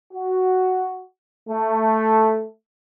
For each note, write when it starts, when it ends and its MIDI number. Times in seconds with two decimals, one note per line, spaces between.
0.13 1.01 66
1.49 2.47 57